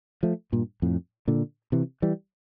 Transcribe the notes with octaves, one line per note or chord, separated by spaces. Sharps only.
F3 A3
G2 A#2
F2 A2
A#2 D3
C3 E3
E3 G3